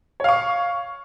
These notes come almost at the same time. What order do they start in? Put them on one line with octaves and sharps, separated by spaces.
C#5 F5 C#6